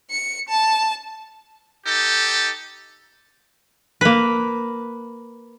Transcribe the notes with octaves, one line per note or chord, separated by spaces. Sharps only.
C#7
A5
D#4 G4 A4
A#3 B4